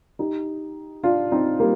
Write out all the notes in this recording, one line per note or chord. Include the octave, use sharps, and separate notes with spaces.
D#4 G4
D4 F4
C4 D#4
G3 A#3